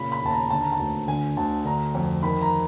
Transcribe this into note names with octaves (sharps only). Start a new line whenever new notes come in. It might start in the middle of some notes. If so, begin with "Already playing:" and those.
Already playing: A#2 C#3 B5
B5
D#2 A5
A#5
D3 A5
A#5
A5
D2
D3 G#5
D2 A5
D3 A#5
F2
D#3 B5
A#5